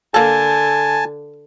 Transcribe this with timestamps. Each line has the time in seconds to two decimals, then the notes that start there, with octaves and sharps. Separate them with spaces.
0.14 D3 A#3 A4 G#5 A5